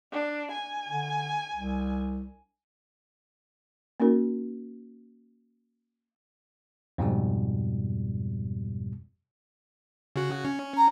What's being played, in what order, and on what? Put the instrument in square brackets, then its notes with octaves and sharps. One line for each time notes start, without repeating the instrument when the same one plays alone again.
[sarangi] D4
G#5
[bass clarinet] D3
C2
[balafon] A#3 C#4 D#4 F#4 A#4
[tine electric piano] F2 G#2 B2 G3
[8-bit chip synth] C#3 F#4
C#4
[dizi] A#5